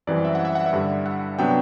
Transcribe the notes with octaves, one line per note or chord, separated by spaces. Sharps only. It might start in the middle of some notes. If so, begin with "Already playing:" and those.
F#2 E3 G3 C4 D5
E5
F#5
E5
F#5
E5
G2 D3 G3
F#5
C3 F#3 B3 D4 G5